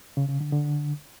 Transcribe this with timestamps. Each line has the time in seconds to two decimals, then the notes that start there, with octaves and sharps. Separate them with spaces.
0.17 C#3
0.29 C#3
0.41 D3
0.52 D3